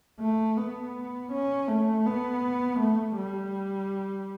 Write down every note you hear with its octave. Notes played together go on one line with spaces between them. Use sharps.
A3
B3
C#4
A3
B3
A3
G3